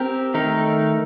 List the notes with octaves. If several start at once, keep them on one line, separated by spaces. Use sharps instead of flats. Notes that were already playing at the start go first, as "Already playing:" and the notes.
Already playing: C4 G4 A#4
D#3 A3 D#4 A#4